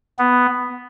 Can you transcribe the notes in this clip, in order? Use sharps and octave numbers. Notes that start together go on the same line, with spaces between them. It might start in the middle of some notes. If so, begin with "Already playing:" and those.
B3